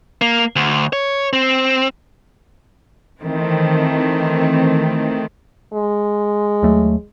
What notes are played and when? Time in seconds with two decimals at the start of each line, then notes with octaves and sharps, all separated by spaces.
0.21 A#3
0.56 D2
0.93 C#5
1.33 C4
3.21 D#3 E3 A3 C4
5.73 G#3
6.62 D#2 F#3 A3